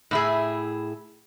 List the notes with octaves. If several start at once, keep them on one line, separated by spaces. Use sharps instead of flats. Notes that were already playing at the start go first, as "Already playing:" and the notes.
A2 E4 G#4